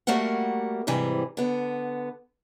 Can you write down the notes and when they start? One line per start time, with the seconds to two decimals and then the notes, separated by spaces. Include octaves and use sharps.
0.07 G3 A3 A#3 F#4 A#4 F#5
0.87 G#2 C3 E3 G3 G#5
1.37 D3 B3